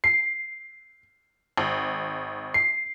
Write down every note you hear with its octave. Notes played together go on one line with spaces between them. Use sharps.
C7
G#1
C7